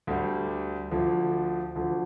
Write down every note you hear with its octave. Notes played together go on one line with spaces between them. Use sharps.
D2 D3 G3
D2 D3 F3
D2 D3 F3